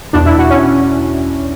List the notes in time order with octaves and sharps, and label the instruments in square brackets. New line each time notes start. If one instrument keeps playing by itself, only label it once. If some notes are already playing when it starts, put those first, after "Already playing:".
[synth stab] E2 B2 D4
E4
F#4
C#4